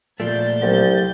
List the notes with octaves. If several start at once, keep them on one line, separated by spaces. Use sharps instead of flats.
A#2 F3 A3 D5 G6 A6
C2 F#3